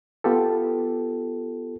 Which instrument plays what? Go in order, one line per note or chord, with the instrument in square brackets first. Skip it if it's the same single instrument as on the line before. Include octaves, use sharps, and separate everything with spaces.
[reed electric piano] B3 F4 G4 A4